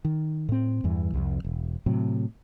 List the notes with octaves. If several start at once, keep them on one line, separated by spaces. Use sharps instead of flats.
D#3
A2 C4
E2 G2 E3
C2 F2
E1
A2 C3 F#3